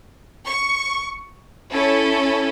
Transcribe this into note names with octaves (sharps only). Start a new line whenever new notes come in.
C#6
C#4 E4 A4